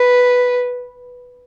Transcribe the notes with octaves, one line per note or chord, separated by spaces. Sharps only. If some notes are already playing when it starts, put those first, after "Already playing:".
Already playing: B4